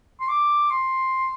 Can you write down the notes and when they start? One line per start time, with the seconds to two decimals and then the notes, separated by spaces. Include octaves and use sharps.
0.20 C6
0.29 D6
0.70 C6